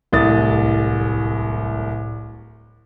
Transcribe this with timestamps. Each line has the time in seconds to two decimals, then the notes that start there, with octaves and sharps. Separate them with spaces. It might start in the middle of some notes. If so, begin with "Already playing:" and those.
0.12 D1 C2 A2 D#6 A6